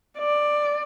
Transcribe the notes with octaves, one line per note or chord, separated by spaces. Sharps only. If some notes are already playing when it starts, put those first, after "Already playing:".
D5